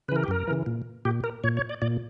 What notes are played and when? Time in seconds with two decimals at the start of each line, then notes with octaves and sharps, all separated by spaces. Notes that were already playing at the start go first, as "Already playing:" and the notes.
0.08 C#3 B4
0.12 E3 A#4
0.24 G4
0.28 F#2 A#4
0.48 C#3 E3
0.66 A#2
1.05 A#2 G4
1.24 A#4
1.44 A#2 C#5
1.57 C#5
1.69 D5
1.82 A#2 D5